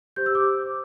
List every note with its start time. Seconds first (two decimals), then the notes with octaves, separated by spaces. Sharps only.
0.16 G4 C5 G6
0.26 E6
0.35 D6